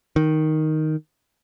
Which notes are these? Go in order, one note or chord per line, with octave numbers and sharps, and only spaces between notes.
D#3